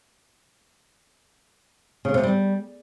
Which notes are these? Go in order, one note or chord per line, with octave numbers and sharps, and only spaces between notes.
C#3
C3
G3